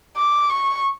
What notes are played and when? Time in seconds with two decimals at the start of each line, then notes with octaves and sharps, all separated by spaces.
0.16 D6
0.50 C#6